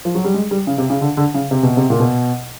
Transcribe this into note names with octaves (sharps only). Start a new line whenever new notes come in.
F3
F#3
G3
G#3
G3
C#3
C3
C#3
D3
D3
C#3
C3
B2
C3
A#2
B2